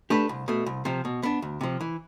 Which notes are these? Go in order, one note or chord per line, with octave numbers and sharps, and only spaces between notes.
A3 D4 G4 B4
C2
B2 A3
C2
C3 F3
B2
B3 D4
D2
C3 F3
E3